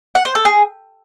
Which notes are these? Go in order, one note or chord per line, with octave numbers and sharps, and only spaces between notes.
F#5
C5
A4
G#4